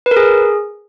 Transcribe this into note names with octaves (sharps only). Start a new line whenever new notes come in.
B4
A#4
G#4